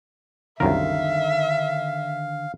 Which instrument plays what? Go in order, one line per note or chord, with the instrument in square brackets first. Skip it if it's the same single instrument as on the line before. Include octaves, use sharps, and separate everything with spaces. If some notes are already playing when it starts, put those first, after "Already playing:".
[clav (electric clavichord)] C2 F#2 A#4 [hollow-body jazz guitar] D3 D#3 [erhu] E5 [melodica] F5